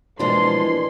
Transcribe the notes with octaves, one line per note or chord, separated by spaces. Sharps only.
B2 E3 F3 G#3 A#3 D4 E4 C6